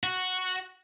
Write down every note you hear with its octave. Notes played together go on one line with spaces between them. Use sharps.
F#4